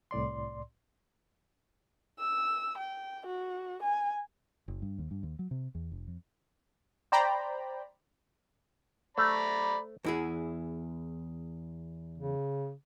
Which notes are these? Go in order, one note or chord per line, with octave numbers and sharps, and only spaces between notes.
C2 A2 D5 C6
E6
G5
F#4
G#5
F#1
G2
D#2
G2
D#2
F#3
C3
E2
F1
F2
C5 D5 G5 A#5 B5
A3 C5 D5 A#5 B5
E2 E4 G#4
C#3